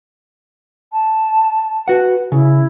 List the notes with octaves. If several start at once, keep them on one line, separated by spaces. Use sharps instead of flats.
A5
F#4 B4 F#5
C#3 E4